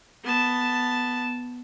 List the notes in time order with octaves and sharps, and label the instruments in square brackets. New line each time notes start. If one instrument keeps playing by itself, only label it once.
[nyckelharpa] B3 A5